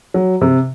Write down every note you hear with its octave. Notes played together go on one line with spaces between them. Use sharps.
F#3
C3